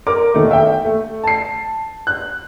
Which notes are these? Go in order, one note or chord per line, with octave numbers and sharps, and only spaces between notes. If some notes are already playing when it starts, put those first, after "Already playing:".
A#4 D6
E1 D#3 A3
E5 G5
A3
A5 C7
F#6